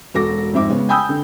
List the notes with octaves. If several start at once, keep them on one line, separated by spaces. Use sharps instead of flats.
E1 F#4 A4 D6 A#6
F2 G#2 E5 D6
C#3 G#3 B3 C#4
G5 G#5 B5 D#6 E6 G6
D3